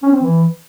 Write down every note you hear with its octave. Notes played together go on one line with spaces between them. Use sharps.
C#4
C4
E3